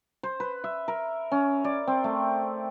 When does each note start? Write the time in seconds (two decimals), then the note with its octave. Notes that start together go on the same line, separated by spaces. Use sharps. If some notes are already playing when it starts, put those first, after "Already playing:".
0.23 C5
0.40 B4
0.64 E5
0.88 A#4
1.32 C#4
1.64 D5
1.87 C4
2.04 A3